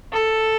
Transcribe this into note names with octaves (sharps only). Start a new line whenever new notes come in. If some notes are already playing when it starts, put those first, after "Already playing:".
A4